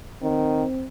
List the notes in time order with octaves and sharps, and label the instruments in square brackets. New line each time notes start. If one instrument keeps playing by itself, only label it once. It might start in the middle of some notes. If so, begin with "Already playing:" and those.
[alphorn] D#3 [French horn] C4